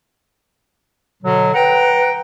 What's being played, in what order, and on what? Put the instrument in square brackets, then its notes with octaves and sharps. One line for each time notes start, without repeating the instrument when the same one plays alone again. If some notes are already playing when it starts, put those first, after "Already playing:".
[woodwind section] B2 D3 F#3
[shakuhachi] B4 [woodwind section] F#5 G5 A#5